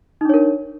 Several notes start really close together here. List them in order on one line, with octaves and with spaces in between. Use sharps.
D#4 D4 C#5 A#4